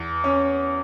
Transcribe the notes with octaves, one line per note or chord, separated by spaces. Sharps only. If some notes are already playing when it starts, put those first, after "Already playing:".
Already playing: E2
C#4